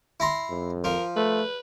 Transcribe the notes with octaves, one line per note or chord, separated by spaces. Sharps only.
E4 A#5 C6
F2
F3 A#4
A3 B4